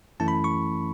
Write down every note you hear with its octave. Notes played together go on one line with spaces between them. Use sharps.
F#2 E3 A3 C#4 E4 A5
B5
C#6